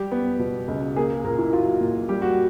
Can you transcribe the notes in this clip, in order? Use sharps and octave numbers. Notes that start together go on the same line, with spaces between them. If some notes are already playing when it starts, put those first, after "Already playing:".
Already playing: G3 G4
B3
B2
C#2
A#3 G#4
A#2 A#4
E4
F#3 F4
A#2
G3 G4
F#4